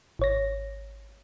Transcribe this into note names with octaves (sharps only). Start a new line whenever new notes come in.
G#1 C#5 A#6